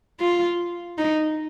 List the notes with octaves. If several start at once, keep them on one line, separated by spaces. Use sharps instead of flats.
F4
D#4